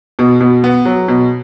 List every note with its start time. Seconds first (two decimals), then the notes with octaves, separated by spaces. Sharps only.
0.19 B2
0.41 B2
0.64 B3
0.85 F#3
1.08 B2